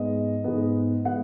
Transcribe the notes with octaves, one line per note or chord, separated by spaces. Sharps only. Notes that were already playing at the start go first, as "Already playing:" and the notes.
Already playing: G#2 G#3 B3 D#5
G#2 G#3 B3
G#3 B3 F#5